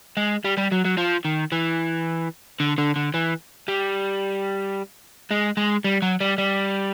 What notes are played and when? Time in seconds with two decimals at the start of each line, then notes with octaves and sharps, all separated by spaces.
0.17 G#3
0.44 G3
0.57 G3
0.71 F#3
0.85 F#3
0.97 F3
1.25 D#3
1.52 E3
2.60 D3
2.78 D3
2.96 D3
3.14 E3
3.68 G3
5.31 G#3
5.57 G#3
5.85 G3
6.02 F#3
6.21 G3
6.38 G3